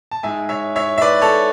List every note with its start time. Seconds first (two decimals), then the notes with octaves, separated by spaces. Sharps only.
0.11 A5
0.23 G#2 G#3 E5 G#5
0.49 C#5 E5
0.76 C#5 E5
0.98 E5
1.02 B4 D5
1.21 A4 C#5